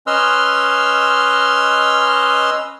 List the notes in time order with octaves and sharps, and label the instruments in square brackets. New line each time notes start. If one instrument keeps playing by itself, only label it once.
[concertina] C#4 B4 D#5 C6 E6 F6